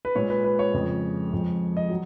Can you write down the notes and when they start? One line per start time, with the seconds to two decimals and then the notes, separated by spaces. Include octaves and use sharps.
0.05 B4
0.16 A#2 G#3 C#5
0.30 B4
0.44 B4
0.59 C#5
0.74 F2 C#3 F3 G#3
1.33 F2 F3 G#3
1.77 D#5
1.90 F#3